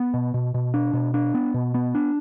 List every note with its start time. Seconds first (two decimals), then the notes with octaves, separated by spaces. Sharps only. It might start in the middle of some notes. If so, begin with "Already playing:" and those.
Already playing: B3
0.14 B2
0.34 B2
0.54 B2
0.74 D4
0.93 B2
1.14 D4
1.34 B3
1.54 B2
1.74 B3
1.95 D4